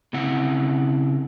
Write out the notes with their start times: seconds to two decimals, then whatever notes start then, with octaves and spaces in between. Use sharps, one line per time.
0.13 C#3 C4 E4 F#5